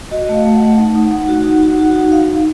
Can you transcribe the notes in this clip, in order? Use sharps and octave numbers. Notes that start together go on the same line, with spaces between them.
F#4 D#5
A3
F5
A3
F#5
A3
D#4 F#5
D#4
D#4 F#5
F#4
D#4
F#4
F#4
D#4
D#4 F5
D#4